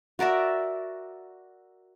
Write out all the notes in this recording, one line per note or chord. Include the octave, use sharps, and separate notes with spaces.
F#4 A#4 D5 E5